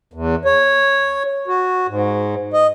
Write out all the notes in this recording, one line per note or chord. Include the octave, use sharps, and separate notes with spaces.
E2
C#5
F#4
G#2
D#5